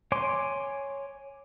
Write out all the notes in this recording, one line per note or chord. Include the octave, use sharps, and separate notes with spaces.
C#5 G#5 C6 D6